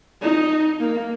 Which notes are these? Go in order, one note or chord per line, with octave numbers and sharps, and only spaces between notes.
D#4
A#3